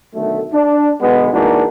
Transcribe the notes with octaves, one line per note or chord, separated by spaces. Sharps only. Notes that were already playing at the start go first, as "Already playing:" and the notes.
B1 D3 D#3 A3
D4
B1 B2 D3 G#3 B3
E3 G#3 A#3 D4 D#4 F#4